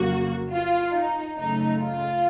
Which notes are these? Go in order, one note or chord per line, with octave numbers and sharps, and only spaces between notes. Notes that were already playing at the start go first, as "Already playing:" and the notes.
Already playing: F2 C#3 F#3 A#3 F#4
F4
D#4
F#2 C#3 A3 D#4
F4